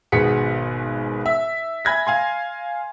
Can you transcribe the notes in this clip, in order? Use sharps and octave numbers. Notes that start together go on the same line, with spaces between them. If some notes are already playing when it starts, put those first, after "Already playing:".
G#1 B2 B3 G#4 B6 C#7
E5
E5 G#5 B5 G#6 A#6
F5 G#5 C6